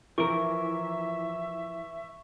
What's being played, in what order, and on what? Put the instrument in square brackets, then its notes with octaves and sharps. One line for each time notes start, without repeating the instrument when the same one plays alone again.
[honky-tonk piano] E3 [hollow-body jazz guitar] F3 A#4 [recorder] E5 [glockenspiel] C#6